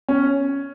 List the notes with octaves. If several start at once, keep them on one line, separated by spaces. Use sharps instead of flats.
C#4